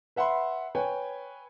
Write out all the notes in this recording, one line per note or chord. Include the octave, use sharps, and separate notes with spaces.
B4 E5 F#5 B5 C6
B4 C#5 G5 G#5